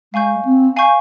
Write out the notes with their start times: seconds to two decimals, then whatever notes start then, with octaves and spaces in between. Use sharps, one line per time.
0.13 G#3 F5 G#5 C#6 G6
0.45 C4
0.76 F5 G#5 C#6 G6